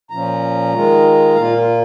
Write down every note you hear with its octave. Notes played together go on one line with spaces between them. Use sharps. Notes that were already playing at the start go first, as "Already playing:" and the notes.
A#2 F3 C#4 A#5
D#3 G#3 F4
A#2 A#3 F4 F5
F4